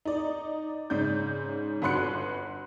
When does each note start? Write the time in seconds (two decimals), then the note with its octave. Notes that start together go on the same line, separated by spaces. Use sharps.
0.05 D#4 D5
0.90 G#2 C#3 D5 G6
1.82 G1 F#4 B4 C6 F#6 C#7